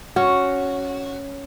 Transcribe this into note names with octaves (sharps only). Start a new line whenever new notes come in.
C#4 F#4